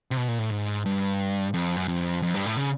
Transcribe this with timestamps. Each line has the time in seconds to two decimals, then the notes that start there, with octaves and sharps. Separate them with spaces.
0.11 C3
0.17 B2
0.28 A#2
0.39 A2
0.51 G#2
0.86 G2
1.54 F2
1.76 F#2
1.88 F2
2.22 F2
2.34 G2
2.46 A2
2.57 C#3